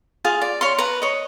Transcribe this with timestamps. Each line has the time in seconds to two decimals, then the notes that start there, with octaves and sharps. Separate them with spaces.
0.25 F4 G#4 F5
0.42 D5
0.61 C#5 F5 C6
0.78 B4 A#5
1.02 C#5 D#5